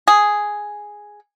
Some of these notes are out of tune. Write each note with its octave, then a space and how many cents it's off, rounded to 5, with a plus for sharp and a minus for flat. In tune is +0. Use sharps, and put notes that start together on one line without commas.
G#4 +0